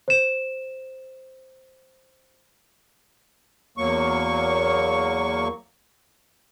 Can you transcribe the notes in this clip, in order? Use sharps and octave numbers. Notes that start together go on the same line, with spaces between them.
C5 E7
E2 F#3 A#3 C#6